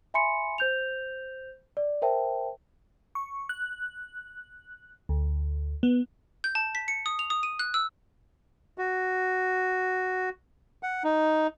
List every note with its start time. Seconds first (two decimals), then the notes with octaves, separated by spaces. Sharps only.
0.14 E5 G#5 B5 C6 C#7
0.58 C5 G6 F7
1.77 D5
2.02 A#4 C5 E5 G5 A5
3.15 C#6
3.49 F#6
5.09 D2
5.83 B3
6.44 G6
6.55 A5
6.75 B6
6.88 C#7
7.06 D#6
7.19 F7
7.30 D#6
7.43 D#7
7.59 F#6
7.74 E6
8.78 F#4
10.83 F#5
11.04 D#4